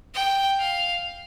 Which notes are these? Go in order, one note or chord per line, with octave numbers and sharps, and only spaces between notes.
G5
F5